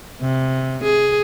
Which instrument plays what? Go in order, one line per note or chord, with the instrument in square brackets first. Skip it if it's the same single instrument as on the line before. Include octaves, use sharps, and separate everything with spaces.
[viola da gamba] C3
G#4